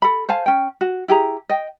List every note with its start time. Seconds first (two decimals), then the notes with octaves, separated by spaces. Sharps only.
0.02 A4 B5
0.29 C5 F5 G#5 A5
0.46 C#4 G5
0.81 F#4
1.08 E4 G4 G#4 A#5
1.49 D#5 G5